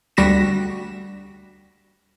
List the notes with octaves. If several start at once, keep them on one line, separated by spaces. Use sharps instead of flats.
D2 G3 F#4 A#6 B6 E7